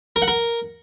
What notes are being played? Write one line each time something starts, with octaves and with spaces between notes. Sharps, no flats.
A#4
F#5
A#4